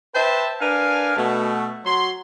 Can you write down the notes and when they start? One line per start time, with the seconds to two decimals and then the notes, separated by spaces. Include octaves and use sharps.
0.15 B4 C5 E5 G5 A5
0.61 D4 A#4 B4 F5 G#5
1.17 B2 A3
1.85 F#3 C6